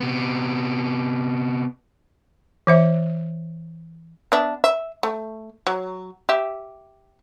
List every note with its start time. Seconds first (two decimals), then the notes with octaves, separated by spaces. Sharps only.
0.01 C3 B3
2.67 E3 C5 E5
4.32 B3 D4 E5
4.64 E5
5.03 A3
5.67 F#3
6.29 G4 E5